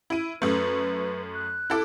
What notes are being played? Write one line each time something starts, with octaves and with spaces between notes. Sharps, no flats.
E4 D#7
F#2 A3 B4
F#6
E4 A4 D6